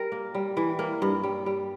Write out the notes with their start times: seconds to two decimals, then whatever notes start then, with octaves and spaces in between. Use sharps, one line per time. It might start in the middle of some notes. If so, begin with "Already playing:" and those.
Already playing: G3 A#4
0.12 A#3
0.35 G3
0.57 E3
0.79 A#3
1.02 G2
1.23 G3
1.46 G3